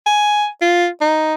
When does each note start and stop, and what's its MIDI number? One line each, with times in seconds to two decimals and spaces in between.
0.06 0.47 80
0.62 0.87 65
1.01 1.35 63